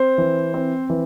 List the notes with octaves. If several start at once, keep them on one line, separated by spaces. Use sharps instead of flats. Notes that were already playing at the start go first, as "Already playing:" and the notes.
Already playing: C4 C5
E3
C4
E3